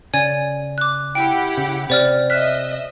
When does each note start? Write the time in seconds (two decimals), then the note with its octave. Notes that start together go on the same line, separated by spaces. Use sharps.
0.14 C#3 D5 G#5 G#6
0.78 D6 F#6
1.15 E4 G4 F#5 G5
1.57 C#3
1.90 C3 C5 D5 F6
2.30 D#5 E5 F6 F#6 B6